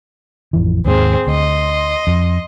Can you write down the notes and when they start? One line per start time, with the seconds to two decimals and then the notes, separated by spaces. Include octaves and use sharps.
0.53 A1 F2 E3
0.85 D#2 G#2 C4 G#4
1.27 D2 D#5 C6
2.07 F2